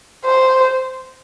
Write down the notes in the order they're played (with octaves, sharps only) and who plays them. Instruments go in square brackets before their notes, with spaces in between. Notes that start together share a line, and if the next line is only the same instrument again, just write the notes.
[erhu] C5